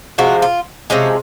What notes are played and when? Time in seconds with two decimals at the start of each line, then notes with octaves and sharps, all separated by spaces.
0.18 C3 F3 G#3 F#4
0.42 F4
0.90 C3 F3 G#3 C#4